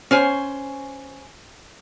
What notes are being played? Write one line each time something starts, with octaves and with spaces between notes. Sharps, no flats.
C#4 C5 G#5